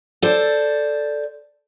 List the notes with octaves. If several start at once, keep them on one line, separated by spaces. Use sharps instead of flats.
A4 C5 D5